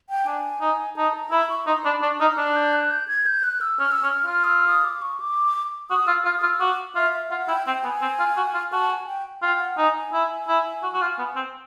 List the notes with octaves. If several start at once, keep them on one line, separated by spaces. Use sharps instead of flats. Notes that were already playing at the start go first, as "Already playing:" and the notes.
G5
D4 G#5
D#4
D#4 A5
A#5
E4 B5
C#6
D#4 C6
D4 B5
D4 C#6
D#4 F6
D4 F#6
G6
F#6
G6
G#6
G6
F#6
E6
C#4 F6
E6
C#4 F6
F4
D#6
E6
D#6
D6
C#6
D6
F#4 D#6
F4 E6
F4 F6
D#6
F4 E6
F#4 D6
F4 E5
E5
F4 F#5
E4 G5
C4 G5
B3 G#5
C4
F4
F#4
F4
F#4 A5
G#5
G5
F4 G5
F#5
D#4 G#5
G#5
E4
E4
F#4
F#4
F4
B3
C4